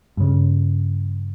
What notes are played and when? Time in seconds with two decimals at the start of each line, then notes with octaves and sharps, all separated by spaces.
0.17 G2 C#3